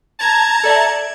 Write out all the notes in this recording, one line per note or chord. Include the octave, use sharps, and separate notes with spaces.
A5 A#5 G#6
A4 D5 E5